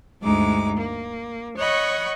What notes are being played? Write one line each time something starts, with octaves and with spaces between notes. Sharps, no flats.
D2 G2 G#3 D#4 D6
A#3
C#5 D#5 F#5 B5 C#6